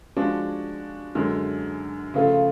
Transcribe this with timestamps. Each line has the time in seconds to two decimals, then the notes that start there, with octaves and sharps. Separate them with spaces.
0.17 F3 G#3 D4 F#4
1.15 F#2 D3 G#3
2.14 C#3 F3 A3 F4 A4